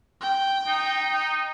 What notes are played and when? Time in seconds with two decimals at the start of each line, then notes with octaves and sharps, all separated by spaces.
0.21 G5
0.67 D#4